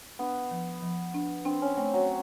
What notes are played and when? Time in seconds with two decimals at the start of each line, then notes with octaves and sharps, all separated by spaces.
0.19 B3 D4
0.51 F3
0.82 F3
1.14 D4
1.45 C4 D4
1.62 C#4
1.77 A3 C4
1.93 F#3